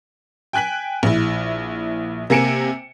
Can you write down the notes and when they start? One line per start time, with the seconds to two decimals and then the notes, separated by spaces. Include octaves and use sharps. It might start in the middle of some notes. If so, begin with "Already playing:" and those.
0.53 G5 G#5 F#6 B6 F#7
1.03 A#1 E4
2.30 C3 A#3 G#5 C#7 D7 E7